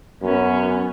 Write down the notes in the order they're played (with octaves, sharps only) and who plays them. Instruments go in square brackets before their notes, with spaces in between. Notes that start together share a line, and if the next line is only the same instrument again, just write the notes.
[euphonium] F#2 [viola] B3 C#4